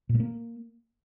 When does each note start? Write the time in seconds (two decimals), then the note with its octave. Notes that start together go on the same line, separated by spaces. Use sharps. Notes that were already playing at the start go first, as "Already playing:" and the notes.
0.09 A#2
0.15 A3
0.20 A#3